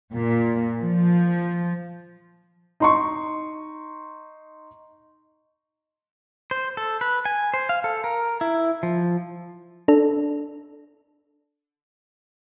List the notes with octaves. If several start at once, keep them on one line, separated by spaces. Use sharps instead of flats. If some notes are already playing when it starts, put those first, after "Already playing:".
A#2
F3
D#4 C6 C#6
C5
A4
B4
G#5
C5
F5
A4
A#4
E4
F3
D4 A4